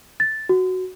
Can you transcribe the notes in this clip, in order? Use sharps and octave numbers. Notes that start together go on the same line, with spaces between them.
A6
F#4